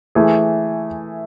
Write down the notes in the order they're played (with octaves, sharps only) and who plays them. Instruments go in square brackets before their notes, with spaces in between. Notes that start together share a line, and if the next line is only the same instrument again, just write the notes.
[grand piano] E3 A3 E4 G#4